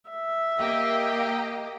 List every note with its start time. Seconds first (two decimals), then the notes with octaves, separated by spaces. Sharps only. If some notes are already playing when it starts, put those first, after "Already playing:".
0.10 E5
0.57 A#3 G4 D#5